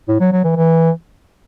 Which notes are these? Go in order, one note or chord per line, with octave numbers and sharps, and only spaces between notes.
A2
F#3
F#3
E3
E3